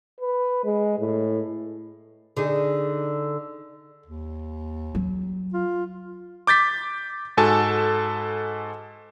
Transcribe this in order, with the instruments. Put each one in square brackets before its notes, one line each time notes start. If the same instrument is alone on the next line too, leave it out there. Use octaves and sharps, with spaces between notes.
[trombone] B4
G#3
A2
[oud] D3 D#4 G#4
[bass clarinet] D#2
[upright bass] F#3
[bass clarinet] F4
[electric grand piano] D6 G6 A6 B6
G#2 F#4 A4 G#5 A5